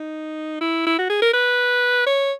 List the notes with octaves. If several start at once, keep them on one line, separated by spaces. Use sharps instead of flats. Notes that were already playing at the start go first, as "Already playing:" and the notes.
Already playing: D#4
E4
E4
F#4
G#4
A#4
B4
C#5